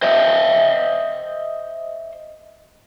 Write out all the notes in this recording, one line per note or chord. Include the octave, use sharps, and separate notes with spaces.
C5 D#5 E5